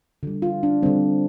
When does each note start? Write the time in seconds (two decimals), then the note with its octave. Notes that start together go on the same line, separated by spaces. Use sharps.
0.23 D3 G3
0.42 F4
0.63 D4
0.83 D3 G3 C4